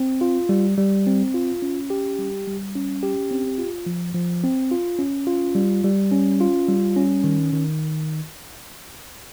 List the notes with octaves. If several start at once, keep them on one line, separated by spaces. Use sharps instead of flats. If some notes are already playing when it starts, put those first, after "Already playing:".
Already playing: C4
F4
G3
G3
C4
F4
C#4
G4
G3
G3
C#4
G4
C4
F4
F3
F3
C4
F4
C#4
F4
G3
G3
C#4
F4
G3
C#4
D#3
D#3